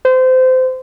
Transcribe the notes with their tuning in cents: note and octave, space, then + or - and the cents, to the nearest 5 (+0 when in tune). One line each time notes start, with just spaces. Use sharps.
C5 -25